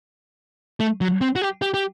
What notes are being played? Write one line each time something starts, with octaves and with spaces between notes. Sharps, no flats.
A3
F#3
C4
F#4
G4
G4
G4